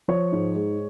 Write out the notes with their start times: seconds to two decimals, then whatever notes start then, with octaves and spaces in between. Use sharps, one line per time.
0.08 F3 C#5
0.32 G#2
0.56 G#3